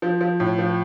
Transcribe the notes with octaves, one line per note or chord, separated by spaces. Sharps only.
F3
F3
A2
F3